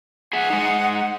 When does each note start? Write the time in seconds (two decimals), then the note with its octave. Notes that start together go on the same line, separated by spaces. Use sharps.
0.33 G#4 E5 F#5
0.50 G#3 D#4